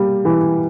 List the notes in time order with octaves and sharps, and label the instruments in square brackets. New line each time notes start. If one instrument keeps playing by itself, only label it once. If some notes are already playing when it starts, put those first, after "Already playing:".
Already playing: [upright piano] G3 A#3
E3